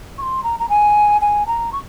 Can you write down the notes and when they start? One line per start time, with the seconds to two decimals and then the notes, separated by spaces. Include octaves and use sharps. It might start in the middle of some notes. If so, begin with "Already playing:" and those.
0.18 C#6
0.22 C6
0.43 A#5
0.60 A#5
0.69 G#5
1.21 G#5
1.47 A#5
1.72 C#6